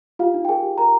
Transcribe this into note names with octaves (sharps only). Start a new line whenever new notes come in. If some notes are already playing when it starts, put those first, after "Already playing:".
F4 G4 F5
D#4
G5
G#4 A#4 G#5
G4
A#4 A#5